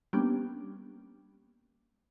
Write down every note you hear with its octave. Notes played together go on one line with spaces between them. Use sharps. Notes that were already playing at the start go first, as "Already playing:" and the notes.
G3 A#3 B3 C#4 D4 G4